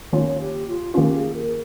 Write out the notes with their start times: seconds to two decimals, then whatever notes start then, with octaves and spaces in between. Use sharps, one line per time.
0.13 D#3 A#3 C#4 F4 C#5
0.40 G4
0.67 F4
0.94 D#3 A#3 C#4 F4 G4
1.14 G#4
1.34 A#4